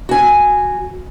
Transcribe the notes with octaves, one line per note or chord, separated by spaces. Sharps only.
F#4 G#5